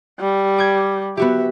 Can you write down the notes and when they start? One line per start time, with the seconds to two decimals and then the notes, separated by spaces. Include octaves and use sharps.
0.20 G3
0.58 D6 G6 G#6
1.17 B3 F#4 G4 E5